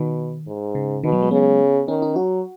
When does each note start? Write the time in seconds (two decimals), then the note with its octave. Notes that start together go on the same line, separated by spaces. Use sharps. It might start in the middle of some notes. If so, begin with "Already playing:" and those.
Already playing: B2 D#3
0.47 G#2
0.75 C#3
1.04 B2 D#3
1.12 F#3
1.22 G#3
1.31 C#3 B3
1.88 D#3 C#4
2.02 D#4
2.16 F#3 F#4